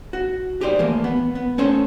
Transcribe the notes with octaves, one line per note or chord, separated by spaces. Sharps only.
F#4
G4 G#4 C5 D5
E3 A3 A#3
B3
B3
A3 C#4 A4 C5